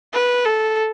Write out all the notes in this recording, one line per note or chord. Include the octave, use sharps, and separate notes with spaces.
B4
A4